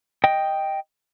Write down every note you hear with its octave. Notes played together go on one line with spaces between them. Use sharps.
D#5 G5